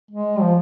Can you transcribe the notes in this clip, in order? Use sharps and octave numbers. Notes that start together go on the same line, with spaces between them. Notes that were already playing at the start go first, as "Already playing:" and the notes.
G#3
F3